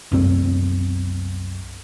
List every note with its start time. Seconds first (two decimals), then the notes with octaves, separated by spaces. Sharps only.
0.12 C2 F#2 C4